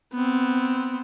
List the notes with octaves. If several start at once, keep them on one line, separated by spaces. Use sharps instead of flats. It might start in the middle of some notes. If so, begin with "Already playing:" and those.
B3 C4